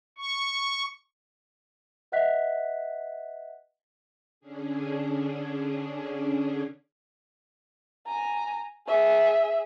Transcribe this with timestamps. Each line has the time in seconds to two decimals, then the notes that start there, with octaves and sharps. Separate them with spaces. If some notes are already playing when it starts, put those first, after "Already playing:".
0.18 C#6
2.12 B4 D#5 E5 F#5 F#6 B6
4.40 D3 C#4 D4 G#4
8.07 G#5 A#5
8.87 G#4 E5